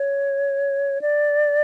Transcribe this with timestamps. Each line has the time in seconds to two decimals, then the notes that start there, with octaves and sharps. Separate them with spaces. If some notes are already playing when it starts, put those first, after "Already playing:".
Already playing: C#5
1.02 D5